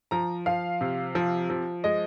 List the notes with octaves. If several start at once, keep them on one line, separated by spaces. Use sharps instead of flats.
F3 A#5
F3 F5
C3
F3
F3
G#3 D#5